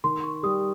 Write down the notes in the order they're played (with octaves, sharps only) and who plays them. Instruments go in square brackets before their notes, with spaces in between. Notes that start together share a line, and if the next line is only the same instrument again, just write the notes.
[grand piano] D#3 [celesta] C6
[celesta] C#6
[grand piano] G3 [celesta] D#6